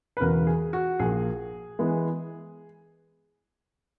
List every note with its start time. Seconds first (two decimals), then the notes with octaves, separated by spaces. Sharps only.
0.17 B4
0.20 E1 E2 C#3 A#4
0.47 G#4
0.73 F#4
0.99 A#1 A#2 A#3 G#4
1.79 E3 G#3 B3